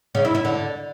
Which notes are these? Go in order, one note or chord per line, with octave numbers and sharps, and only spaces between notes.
C#3
E4
E4
D3